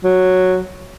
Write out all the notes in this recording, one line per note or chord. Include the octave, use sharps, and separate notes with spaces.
F#3